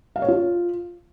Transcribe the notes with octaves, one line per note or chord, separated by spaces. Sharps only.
F5
C#5
F4